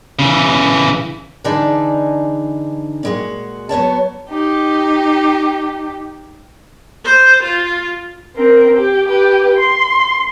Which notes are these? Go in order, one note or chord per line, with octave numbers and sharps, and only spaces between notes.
C#3 E3
D3 E3 D4 D#4 G#4 A5
A#2 G#3 F#4
F#3 B3 C#5 A5
D#4 G4
C5
F4
C4 A#4
G4
G4 B4
C6